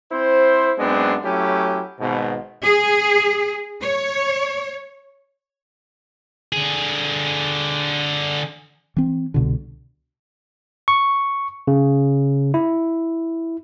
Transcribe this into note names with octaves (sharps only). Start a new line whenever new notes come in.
C4 E4 C5
F#2 G#3 B3 C4 D4
F#3 A3 C#4 E4 G4
G#1 G#2 B2
G#4
C#5
D3 G#4
E3 C4
C2 B2 D3
C#6
C#3
E4